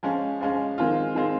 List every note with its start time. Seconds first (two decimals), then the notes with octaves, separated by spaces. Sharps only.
0.03 F3 G#3 C#4
0.41 F3 G#3 C#4
0.78 D#3 G#3 C4 F4
1.15 D#3 G#3 C4 F4